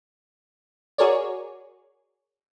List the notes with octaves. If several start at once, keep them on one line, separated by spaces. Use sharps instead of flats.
F#4 G#4 A#4 C#5 D5